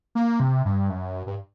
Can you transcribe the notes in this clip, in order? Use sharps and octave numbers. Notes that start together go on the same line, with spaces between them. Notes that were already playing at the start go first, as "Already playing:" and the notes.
A#3
C3
G2
F#2
G2